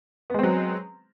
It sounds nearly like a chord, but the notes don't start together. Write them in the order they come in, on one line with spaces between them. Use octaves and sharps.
B3 G#3 C4 F#3